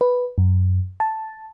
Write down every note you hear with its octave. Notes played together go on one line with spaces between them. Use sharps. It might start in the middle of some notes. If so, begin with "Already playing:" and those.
B4
F#2
A5